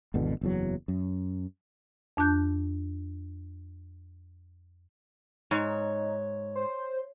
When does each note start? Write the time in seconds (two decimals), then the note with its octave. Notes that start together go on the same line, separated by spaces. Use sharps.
0.14 G#1 E2 B2 D3
0.41 F#1 E2 F#3
0.88 F#2
2.17 F2 D4 A5 F#6 G6
5.51 G#2 D#4 C#5
6.56 C5